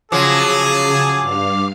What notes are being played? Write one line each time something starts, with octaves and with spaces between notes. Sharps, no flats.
C#3 F3 F#3 G#4 A5 D6
G2 F5 F6